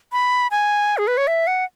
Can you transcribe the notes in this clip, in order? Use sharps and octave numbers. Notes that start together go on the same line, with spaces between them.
B5
G#5
G#4
B4
C#5
E5
F#5